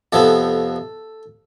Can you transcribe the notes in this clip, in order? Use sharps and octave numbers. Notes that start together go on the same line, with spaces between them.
F2 C3 F3 B3 A4